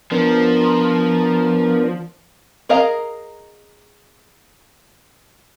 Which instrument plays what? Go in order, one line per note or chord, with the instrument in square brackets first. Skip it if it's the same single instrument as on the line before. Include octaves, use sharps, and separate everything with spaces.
[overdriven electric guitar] F3 [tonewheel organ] B3 D4 A#4
[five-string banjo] G#4 A#4 D#5 F5 A#5